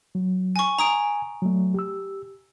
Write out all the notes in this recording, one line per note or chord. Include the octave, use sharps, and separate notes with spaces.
F#3
G#5 C#6
G#5 A#5 D#6 D7
F#3 A3
G4 E6